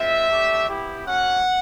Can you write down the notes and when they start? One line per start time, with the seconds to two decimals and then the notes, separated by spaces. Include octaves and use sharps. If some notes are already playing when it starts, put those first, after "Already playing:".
Already playing: G#3 C4 F4 E5
0.29 A3 D4 G4
0.68 B3 E4 G4
1.06 A#3 C#4 F#4 F#5